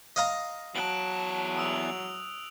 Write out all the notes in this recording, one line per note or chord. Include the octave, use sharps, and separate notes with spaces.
D#5 F5 A#5
E2 F#3 A5 F#6 D7 F#7
D#6 E6 F7